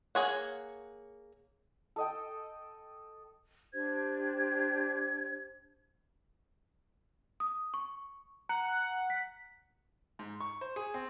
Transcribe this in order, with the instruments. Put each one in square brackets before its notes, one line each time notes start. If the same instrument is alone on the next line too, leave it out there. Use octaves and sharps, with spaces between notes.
[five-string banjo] A#3 G#4 C#5 F#5
[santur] A4 D#5 G5
[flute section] D4 G4 C5 G#6
[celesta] D#6
C#6
[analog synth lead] F#5 [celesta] A#5
[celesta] B6
[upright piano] G#2
C#6
C5
G#4
C4